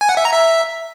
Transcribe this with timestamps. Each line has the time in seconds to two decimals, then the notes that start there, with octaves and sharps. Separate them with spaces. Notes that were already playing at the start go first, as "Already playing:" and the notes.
0.01 G#5
0.09 F#5
0.17 E5
0.25 A#5
0.33 E5